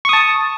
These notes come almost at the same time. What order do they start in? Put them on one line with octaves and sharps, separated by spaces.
C#6 D#6 A5